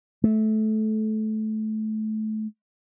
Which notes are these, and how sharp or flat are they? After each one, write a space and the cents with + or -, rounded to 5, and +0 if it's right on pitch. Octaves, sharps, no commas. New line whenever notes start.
A3 -20